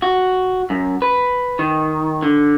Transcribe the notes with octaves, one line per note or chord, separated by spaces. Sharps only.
F#4
F#2
B4
D#3
D3